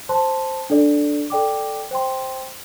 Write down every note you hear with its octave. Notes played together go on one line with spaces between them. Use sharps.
C5 A5 C6
D4 A4 D5
A4 D5 G5 D6
C5 G5 C6